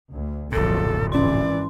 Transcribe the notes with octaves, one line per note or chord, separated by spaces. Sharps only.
D2
D1 B1 F#2 A#2 F3 A4
G#1 E3 C#4 D5 C6